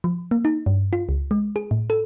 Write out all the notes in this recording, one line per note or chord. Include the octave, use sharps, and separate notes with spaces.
F3
A#3
D#4
G2
F4
C#2
G#3
G#4
A2
A4